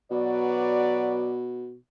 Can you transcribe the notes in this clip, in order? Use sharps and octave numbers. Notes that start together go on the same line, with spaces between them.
B2 F#3 B4 D5